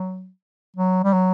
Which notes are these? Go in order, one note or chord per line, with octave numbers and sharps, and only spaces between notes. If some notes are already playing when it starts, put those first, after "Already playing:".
Already playing: F#3
F#3
G3
F#3